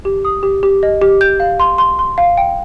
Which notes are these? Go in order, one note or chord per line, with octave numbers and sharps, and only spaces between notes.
G4
D#6
G4
G4
D#5
G4
G6
F5
C6
C6
C6
F5
G5